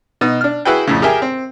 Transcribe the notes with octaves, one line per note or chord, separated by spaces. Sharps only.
B2 D#4
D4 F6
E4 F#4 G#4 B4 G5
F2 A2 C#3
G4 G#4 A#4 E5 G5 G#5
C4